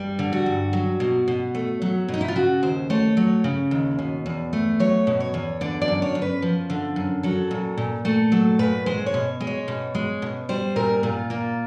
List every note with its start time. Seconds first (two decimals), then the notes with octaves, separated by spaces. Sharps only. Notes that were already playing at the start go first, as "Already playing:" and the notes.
Already playing: G2 G3
0.19 D3
0.33 F#4
0.46 G2
0.73 F#3
1.00 B2
1.28 B2
1.55 A3
1.82 F#3
2.08 B2
2.14 D#4
2.21 E4
2.28 F4
2.36 C#3 F#4
2.63 D#2 C5
2.90 A3 C#5
3.17 F#3 C#5
3.44 C#3
3.71 D#2
3.99 B2
4.26 E2
4.53 A3
4.80 F#3 C#5
5.07 B2
5.20 C#5
5.34 E2
5.61 D3 D5
5.82 D5
5.88 F#2
6.02 C#5
6.15 F#2
6.22 B4
6.42 F3
6.70 D3
6.96 F#2
7.23 F#3 A4
7.51 A#2
7.77 A#2
8.05 A3 A4
8.32 F#3 A4
8.59 A#2 B4
8.86 G#3 C5
9.06 C#5
9.14 B2
9.41 G#3
9.47 C#5
9.68 B2
9.95 G#3
10.22 B2
10.49 G3 C5
10.76 A#2 A#4
11.03 A#2 F4
11.30 A#3 F4